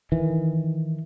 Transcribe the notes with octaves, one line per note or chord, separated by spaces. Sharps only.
D#3 E3